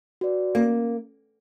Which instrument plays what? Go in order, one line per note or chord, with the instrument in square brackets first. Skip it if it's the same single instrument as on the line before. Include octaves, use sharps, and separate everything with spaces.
[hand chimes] F#4 B4 D5
[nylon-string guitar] A#3 [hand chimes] C#4